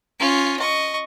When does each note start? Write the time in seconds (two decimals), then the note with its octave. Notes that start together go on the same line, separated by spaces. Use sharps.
0.20 C#4 F4
0.59 D#5 C#6